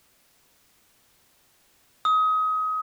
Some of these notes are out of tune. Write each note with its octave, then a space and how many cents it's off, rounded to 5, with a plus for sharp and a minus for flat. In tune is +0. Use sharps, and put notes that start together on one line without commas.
D#6 +25